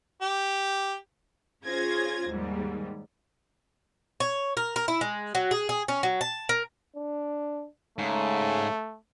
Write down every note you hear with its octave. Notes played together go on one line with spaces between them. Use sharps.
G4
C#4 F4 G#4 C5 G#6 A#6
D#2 G#2 G3
C#5
A#4
A#4
E4
G#3
F#3
G#4
G#4
C#4
F#3
A5
A#4
D4
G#2 C#3 A3